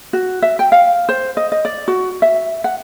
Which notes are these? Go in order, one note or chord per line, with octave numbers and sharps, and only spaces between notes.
F#4
E5
G5
F5
C5
D#5
D#5
D5
F#4
E5
F#5